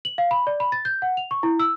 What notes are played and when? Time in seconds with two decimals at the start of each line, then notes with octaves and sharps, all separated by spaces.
0.05 F#7
0.18 F5
0.31 B5
0.47 D5
0.60 B5
0.72 A6
0.85 G6
1.02 F#5
1.17 F7
1.31 C#6
1.43 E4
1.59 E6